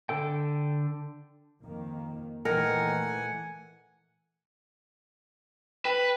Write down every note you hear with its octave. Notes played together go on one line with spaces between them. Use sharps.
D3 A4 G5
F2 D#3 A#3
A#2 D#3 E3 A3 A#4 F#5 G#5
B4 G5